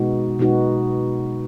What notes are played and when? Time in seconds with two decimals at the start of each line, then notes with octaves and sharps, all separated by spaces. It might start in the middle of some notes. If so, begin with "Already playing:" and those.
Already playing: B2 G#3 B3 D#4 F#4
0.39 B2 G#3 B3 D#4 F#4